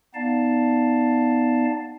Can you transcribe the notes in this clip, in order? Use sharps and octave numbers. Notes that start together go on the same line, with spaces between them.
B3 D#4 D5 F5 A5